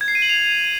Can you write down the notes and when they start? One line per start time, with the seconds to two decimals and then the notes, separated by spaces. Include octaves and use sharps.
0.01 G#6
0.08 C7
0.15 D#7
0.22 F#7
0.29 F7